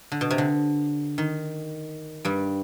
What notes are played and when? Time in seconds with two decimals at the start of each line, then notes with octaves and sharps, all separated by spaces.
0.12 D3
0.21 B2
0.30 C3
0.38 D3
1.18 D#3
2.25 G2 G3